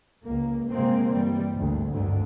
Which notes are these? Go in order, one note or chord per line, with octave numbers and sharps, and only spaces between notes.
C#2 A#3
G1 C3 G#3 A#3 C4
E3 G3
G#1 D2
G#1 D2 G2 D3